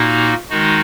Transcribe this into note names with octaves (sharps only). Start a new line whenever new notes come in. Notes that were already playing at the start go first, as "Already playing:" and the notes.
Already playing: A#2 A#3 D#4 F#4
D#3 G#3 D#4 F#4